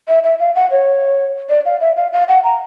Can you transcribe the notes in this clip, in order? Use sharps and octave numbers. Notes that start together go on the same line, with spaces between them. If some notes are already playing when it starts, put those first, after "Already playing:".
E5
E5
F5
F#5
C#5
D5
F5
E5
F5
F5
F#5
A#5